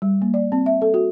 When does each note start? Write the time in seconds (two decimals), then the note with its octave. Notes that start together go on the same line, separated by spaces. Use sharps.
0.02 G3
0.22 A#3
0.34 D5
0.52 C4
0.66 E5
0.82 A4
0.94 F#4